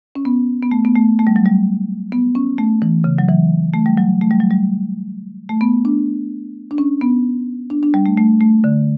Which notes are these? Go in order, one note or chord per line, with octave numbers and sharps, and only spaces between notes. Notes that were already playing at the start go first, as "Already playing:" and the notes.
C#4
B3
B3
A3
B3
A3
A3
G3
F#3
G3
B3
C#4
A3
E3
C#3
F#3
E3
A3
G3
F#3
A3
G3
F#3
G3
A3
B3
D4
D4
C#4
B3
D4
D4
G3
A3
A3
A3
D3